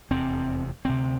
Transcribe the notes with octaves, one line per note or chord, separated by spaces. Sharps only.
F1 E2 C3 C4
D2 C3 C4